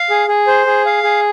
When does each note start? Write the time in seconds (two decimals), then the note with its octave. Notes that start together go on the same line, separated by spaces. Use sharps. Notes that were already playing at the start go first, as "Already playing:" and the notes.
Already playing: F5
0.10 G#4
0.28 G#4
0.47 C5
0.66 G#4
0.86 F5
1.03 G#4